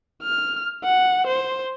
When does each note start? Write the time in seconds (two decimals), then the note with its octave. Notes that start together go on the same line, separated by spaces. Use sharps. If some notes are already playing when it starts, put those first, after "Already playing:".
0.23 F6
0.84 F#5
1.27 C5